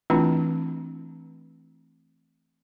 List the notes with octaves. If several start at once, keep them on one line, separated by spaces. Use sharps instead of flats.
E3 A3 C4 D4 E4 F4